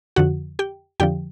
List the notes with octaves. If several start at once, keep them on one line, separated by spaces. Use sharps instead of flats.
F2 D3 F3 F#4 F#5
G4 G5
F2 D3 F3 G4 G5